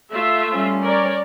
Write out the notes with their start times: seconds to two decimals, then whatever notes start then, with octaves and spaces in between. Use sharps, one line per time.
0.12 A3 F4 E5
0.53 G3 C#4
0.83 A#4 C#5 D5